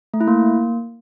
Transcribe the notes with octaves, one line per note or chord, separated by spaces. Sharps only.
A3
E4
A#3